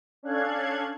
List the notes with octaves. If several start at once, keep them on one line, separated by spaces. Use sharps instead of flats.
C#4 D4 A4 F5 F#6 G#6